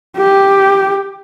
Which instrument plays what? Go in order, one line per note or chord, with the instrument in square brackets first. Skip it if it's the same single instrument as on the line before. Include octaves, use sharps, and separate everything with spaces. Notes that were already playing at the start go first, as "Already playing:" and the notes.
[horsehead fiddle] G4